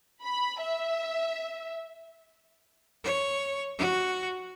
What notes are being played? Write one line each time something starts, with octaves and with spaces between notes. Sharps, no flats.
B5
E5
C#5
F#4